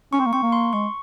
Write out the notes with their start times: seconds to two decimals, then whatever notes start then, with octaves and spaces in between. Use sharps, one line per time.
0.13 C#4 C#6
0.20 C4
0.26 A#3
0.33 C4 C#6
0.43 A#3
0.52 C6
0.73 G#3 C#6